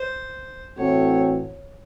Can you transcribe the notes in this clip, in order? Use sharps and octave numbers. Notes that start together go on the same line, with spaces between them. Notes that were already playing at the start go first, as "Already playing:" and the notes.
Already playing: C5
A2 E3 A3 C4 F#4 C#5